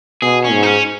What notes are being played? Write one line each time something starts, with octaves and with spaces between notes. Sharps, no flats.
B2 G#4
C#4
G#2
D#4
C#4